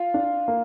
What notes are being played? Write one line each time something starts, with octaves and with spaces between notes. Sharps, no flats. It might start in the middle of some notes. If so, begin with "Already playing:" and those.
Already playing: F4 F5
D4
A#3